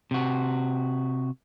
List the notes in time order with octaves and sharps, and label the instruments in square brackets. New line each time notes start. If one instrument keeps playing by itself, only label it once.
[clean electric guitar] C3 F#4